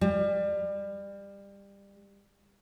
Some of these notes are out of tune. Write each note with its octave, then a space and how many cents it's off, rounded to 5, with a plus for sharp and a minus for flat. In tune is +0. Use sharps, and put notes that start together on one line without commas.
G3 +25